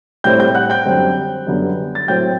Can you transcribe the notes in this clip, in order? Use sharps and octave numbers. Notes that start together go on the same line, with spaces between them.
A2 G3 C4 G5 G6
G5 G6
F#5 F#6
G5 G6
F#2 D3 G3 C4
F#2 D3 G3 B3
A6
A2 F#3 C4 G5 G6